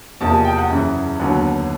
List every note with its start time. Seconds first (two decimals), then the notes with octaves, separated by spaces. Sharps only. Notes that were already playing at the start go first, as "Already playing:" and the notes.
0.21 E2 C3 F3 A#3 A5
0.33 G#5
0.45 G5
0.58 F#5
0.70 F#2 C#3 E3
1.19 D#2 D3 F#3 B3